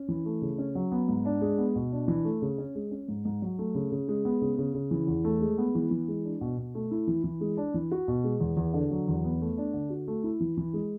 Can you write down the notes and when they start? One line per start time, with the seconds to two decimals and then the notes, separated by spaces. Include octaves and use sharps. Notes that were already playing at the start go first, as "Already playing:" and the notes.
Already playing: C#4
0.09 E3
0.25 A3
0.42 C#3
0.58 C#4
0.75 F#3
0.92 B3
1.08 G#2
1.25 D4
1.41 G#3
1.58 B3
1.76 B2
1.92 D4
2.08 E3
2.25 A3
2.42 C#3
2.58 C#4
2.75 G#3
2.91 C#4
3.08 G#2
3.25 G#2
3.42 F#3
3.59 A3
3.75 C#3
3.92 C#3
4.08 G#3
4.25 B3
4.41 C#3
4.58 C#3
4.74 C#3
4.91 E3
5.07 E2
5.24 A3
5.41 G#3
5.58 B3
5.75 E3
5.91 E3
6.08 G#3
6.24 D4
6.41 B2
6.58 B2
6.75 A3
6.91 E4
7.08 E3
7.24 E3
7.41 G#3
7.57 D4
7.74 E3
7.91 F#4
8.08 B2
8.24 G#3
8.40 E2
8.57 E2
8.74 D3
8.91 F#3
9.08 E2
9.24 B3
9.41 A3
9.57 D4
9.74 D3
9.90 F#4
10.08 A3
10.24 E4
10.40 E3
10.57 E3
10.73 G#3